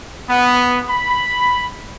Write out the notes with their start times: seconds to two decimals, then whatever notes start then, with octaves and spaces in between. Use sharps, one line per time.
0.28 B3
0.89 B5